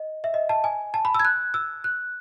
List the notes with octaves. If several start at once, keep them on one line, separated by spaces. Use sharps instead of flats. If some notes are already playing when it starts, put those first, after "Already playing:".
Already playing: D#5
E5
D#5
A5
G#5
A5
B5
E6
G#6
F#6
E6
F#6